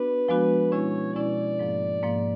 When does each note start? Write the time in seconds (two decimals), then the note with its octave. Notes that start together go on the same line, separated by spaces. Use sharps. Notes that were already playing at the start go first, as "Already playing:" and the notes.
Already playing: B3 D4 F#4 B4
0.28 F3 G#3 B3 D4 F#4
0.72 B2 G#3 C#4 E4 C#5
1.16 B2 G#3 C#4 E4 D5
1.59 G#2 F3 A#3
2.03 G#2 F3 A#3